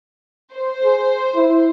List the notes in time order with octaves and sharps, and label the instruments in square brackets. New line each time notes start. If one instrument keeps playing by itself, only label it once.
[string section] C5
[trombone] G#4
E4